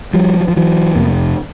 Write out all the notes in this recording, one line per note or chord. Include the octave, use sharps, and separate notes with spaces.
F3 G3
F#3
F3
E3 F#3
F2 C3 A#3